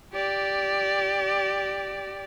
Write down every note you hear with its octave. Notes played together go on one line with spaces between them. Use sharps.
G4 D5